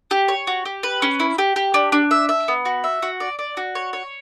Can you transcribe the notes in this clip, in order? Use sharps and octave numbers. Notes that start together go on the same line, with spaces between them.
G4
C#5
F#4
G4
B4
C#4
E4
G4
G4
D4
D4
E5
E5
B3
F#4
E5
F#4
D5
D5
F#4
C#5
C#5